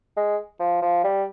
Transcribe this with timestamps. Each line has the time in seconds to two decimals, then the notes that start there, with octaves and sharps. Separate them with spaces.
0.17 G#3
0.60 F3
0.82 F3
1.04 G3